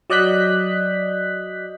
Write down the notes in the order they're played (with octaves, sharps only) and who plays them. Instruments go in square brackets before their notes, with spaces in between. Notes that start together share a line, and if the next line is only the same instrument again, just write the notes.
[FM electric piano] F#3 D5 D#5 F#6 G6 B6